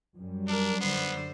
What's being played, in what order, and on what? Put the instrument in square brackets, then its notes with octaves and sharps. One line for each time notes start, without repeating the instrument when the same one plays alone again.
[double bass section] F#2 G3
[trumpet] D4 [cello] A#4
[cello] D3 C5 [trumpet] B3